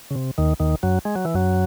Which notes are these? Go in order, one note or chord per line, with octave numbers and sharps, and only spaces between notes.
C#3
C3
D#2 D#3
D#2 D#3
F#2 F#3
G#3
F#3
E3
F#2 F#3